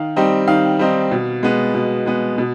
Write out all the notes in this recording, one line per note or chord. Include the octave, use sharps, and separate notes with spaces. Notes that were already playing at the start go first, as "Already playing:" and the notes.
Already playing: D#3 F5
G3 C4 D#4
D#3 F5
G3 C4 D#4
B2
G#3 B3
B2
G#3 B3
B2